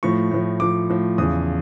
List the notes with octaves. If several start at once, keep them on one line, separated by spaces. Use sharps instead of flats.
A2 F3 C#6
A2 F3
A2 F3 D6
A2 F3
E2 C#3 F3 D#6